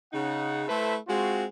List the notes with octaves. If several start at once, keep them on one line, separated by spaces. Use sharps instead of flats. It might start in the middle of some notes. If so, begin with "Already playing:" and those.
C#3 D#4 F#5
A3 E4 A4 B4 C5 E5
G#3 C4 F4 F#4